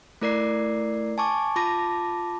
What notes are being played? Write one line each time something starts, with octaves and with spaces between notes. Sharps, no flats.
A3 E4 A#4 D5 D6 C7
G#5 A5 C#6 D6
F4 A5 B5 D6 A#6